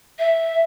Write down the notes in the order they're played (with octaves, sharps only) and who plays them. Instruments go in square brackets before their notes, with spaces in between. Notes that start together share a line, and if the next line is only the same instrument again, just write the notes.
[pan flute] E5